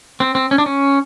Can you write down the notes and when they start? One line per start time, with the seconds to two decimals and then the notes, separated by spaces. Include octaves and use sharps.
0.20 C4
0.35 C4
0.51 C#4
0.58 D4
0.66 C#4